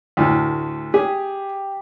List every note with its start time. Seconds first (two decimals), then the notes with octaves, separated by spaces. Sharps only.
0.17 D2 A2
0.94 G4 G#4